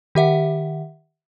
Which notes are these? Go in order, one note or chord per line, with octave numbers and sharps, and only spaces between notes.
D#3 G4 E5 F#5